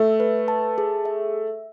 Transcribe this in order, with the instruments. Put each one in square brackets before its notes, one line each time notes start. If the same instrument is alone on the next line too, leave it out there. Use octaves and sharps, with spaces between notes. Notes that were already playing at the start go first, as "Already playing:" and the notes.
Already playing: [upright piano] A3 [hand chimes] E5
[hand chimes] B4
A5
G#4
E5